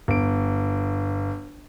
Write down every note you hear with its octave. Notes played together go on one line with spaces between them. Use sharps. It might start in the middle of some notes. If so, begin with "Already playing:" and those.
G1 D7